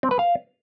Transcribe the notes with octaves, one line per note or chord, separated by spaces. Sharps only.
C4
B4
F5